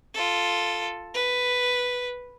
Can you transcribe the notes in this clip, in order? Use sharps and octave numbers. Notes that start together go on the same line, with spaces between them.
F4 A4
B4